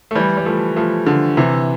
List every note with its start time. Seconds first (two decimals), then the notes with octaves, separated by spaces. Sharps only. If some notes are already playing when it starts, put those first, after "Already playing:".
0.11 A3
0.15 E3 G3
0.37 G3
0.46 F3 A3
0.76 F3 A3
1.07 D3 F3
1.37 C3 E3